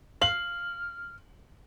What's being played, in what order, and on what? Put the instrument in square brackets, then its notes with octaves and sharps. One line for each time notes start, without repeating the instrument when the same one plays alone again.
[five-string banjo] F5 [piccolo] F6 [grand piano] F#7